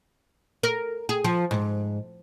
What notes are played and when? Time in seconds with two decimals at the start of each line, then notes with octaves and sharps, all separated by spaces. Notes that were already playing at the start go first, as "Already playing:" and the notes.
0.63 A#4
1.09 G#4
1.24 F3
1.51 G#2